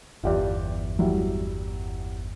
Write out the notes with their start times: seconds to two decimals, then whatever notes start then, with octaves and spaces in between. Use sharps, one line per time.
0.23 G1 E2 F4 G4 D5
0.99 F#3 G3 E4